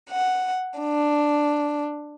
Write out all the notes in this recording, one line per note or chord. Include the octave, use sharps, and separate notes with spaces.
F#5
D4